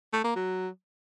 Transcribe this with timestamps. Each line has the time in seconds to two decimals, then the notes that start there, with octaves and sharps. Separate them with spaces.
0.13 A3
0.24 A#3
0.36 F#3